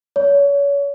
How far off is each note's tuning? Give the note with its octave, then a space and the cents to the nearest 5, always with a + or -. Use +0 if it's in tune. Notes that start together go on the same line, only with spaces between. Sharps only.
C#5 +30